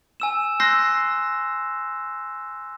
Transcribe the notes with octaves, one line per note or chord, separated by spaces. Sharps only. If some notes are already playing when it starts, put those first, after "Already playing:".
G#5 E6 E7
C6 E6 F#6 G6 A#6 C7